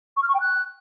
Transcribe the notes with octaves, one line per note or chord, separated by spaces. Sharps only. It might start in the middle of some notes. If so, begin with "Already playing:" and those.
C#6
F6
C#6
G5
F#6